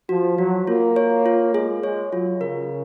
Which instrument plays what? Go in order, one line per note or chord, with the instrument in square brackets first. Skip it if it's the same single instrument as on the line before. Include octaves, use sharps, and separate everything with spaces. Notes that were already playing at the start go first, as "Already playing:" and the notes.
[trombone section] F3 [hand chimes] F#4
[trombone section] F#3 [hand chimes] F#4
[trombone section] A#3 [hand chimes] F4
[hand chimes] C#5
F4
[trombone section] G#3 [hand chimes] G#4
[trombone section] G#3 [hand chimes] C#5
[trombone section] F#3 [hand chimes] F4
[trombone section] C#3 [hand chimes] A#4